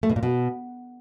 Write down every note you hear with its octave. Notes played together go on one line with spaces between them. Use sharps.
A3
B2
A#2
B2